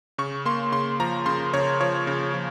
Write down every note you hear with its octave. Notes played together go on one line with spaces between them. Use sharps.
C#3 C#6
A#3 C6
C#3 C6
F3 A#5
C#3 C6
C#3 C#5
F3 C#5
C#3
F3